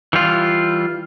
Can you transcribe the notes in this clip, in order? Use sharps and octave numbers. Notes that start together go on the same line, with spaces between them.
E3 G3 F4